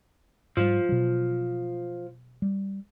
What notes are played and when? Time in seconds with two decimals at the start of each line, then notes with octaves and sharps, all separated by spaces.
0.57 G#2 F3 G3
0.89 B2 F#3
2.42 G3